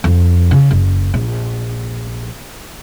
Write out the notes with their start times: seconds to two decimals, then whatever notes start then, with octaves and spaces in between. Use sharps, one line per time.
0.04 F2
0.51 C#3
0.71 F#1
1.14 A#1